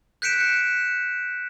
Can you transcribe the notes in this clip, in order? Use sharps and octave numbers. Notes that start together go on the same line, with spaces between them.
F#6 G6 B6 C#7 D7 E7